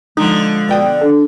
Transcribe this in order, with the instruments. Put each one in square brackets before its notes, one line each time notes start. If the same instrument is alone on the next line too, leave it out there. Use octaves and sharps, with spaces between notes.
[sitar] D3 F3 [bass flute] G#3 [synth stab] D#4
[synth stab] B2 G5 D#6 [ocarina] D5
[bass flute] D4 [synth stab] A4